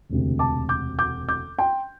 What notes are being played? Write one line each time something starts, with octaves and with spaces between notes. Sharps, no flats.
E1 D2 C3
A5 D6
D6 G6
D6 G6
D6 G6
G5 C6